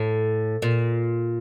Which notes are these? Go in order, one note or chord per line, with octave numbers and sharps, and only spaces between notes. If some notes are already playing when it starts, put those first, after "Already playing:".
Already playing: A2
A#2